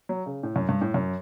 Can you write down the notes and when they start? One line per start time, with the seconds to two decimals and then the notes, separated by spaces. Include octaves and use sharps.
0.09 F#3
0.26 C#3
0.43 A2
0.56 F#2
0.69 G2
0.81 A2
0.94 F#2